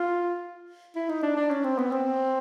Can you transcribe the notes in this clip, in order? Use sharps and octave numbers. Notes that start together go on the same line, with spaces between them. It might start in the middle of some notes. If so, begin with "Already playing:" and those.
Already playing: F4
E4
D#4
D4
D4
C#4
C4
B3
C4